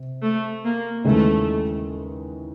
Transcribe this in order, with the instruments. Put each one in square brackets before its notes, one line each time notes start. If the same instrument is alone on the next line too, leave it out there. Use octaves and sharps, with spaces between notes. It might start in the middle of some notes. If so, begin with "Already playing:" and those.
Already playing: [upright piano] C3
[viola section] A3
A#3
[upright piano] D#2 C#3 E3 G#3 [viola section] A3